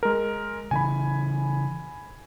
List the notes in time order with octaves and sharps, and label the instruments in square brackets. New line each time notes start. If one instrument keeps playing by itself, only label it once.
[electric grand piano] G#3 A#4
[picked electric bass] C#3 E3 [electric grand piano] G#5 B5